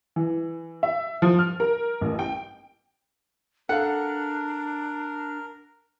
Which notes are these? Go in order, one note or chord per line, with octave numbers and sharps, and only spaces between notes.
E3
E5
F3
F6
A#4
A1
G5
D4 A4 A#4 F5 F#5